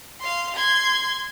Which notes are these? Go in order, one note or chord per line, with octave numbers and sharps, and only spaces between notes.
F5 C6
C6 G#6